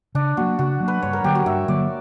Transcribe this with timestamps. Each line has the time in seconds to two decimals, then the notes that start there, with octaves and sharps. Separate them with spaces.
0.15 C#3 D4
0.37 F#3 A#3 F#4
0.59 C#3 F#4
0.80 F#3 A#3
0.88 B4
1.02 G2 C#5
1.13 A#4
1.24 D3 F#3 A#3 G4
1.35 F#4
1.46 G2 E5
1.68 D3 F#3 A#3 D5